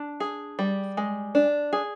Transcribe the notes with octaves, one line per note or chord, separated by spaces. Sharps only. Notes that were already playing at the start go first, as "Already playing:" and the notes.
Already playing: D4
G#4
G3
G#3
D4
G#4